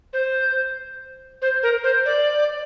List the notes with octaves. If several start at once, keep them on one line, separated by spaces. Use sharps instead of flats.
C5
C5
A#4
C5
D5